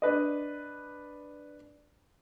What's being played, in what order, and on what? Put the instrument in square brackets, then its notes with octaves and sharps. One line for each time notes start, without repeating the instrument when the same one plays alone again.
[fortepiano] D4 B4 D#5